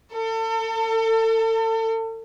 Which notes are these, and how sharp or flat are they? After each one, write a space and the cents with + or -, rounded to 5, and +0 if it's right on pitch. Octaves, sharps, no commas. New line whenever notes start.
A4 +35